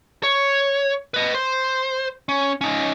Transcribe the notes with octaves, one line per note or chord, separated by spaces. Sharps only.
C#5
B4 D#5
C5
C#4
C#4 D#4